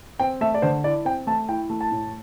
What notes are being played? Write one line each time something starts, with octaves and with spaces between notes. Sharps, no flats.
C4 G5
A3 E5
D5
D3 C5
E4 D5
C4 G5
A3 A5
E4 G5
A3
A5
A2